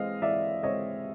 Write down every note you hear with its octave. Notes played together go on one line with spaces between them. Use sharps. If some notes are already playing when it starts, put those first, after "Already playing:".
Already playing: E3 G#3 C4 D#5 F5
E3 D5 E5
G#3 C4 C#5 D#5